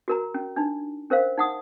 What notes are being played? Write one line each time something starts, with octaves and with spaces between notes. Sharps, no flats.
F#4 A#4 A#5
C#4
D4 D#4
C#4 A#4 C5 F5
D#4 F#5 D#6